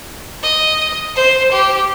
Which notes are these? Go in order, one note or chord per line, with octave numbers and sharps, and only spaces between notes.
D#5
C5
G4